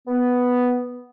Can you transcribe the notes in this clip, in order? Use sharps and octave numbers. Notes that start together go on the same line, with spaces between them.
B3